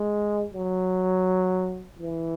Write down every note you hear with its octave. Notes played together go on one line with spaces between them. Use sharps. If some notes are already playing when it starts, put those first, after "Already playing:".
Already playing: G#3
F#3
E3